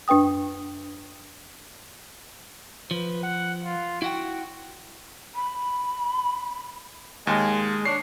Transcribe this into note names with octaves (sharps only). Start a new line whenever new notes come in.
F#2 D4 B4 G5 D#6
F3 B4
F#5
F4
E4 F#4 F#5 G5
B5
D#2 G#3
D4 C#5 C7